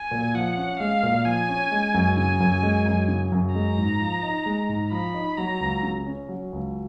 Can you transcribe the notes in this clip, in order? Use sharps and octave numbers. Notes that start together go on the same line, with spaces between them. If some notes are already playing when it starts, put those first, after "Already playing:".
Already playing: G#5
A#2
F3 F#5
C#4
G#3 F5
A#2
F3 G#5
C#4
G#3
F#2
C#3 G#5
F#2
G#3
F#2
C#3
F#2
G#3 A#5
G#2
F3
D#4
G#3
G#2
F3 B5
D#4
F#3 A#5
C#2
C#3
C#4
F#3
C#2